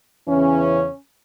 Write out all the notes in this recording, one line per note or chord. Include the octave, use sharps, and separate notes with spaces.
E2 C#3 E3 C#4